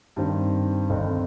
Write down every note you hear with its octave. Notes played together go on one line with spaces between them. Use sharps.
G2 D#3 C4
G1 F2 D#3 C4 D#4